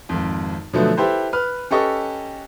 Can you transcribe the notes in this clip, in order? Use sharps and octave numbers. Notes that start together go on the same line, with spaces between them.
G#1 F2
B2 D3 F3 F#3 A3 B3
E4 G4 A4 B4 C5
B4 F6
C#4 G4 A4 B4 D#5 C#6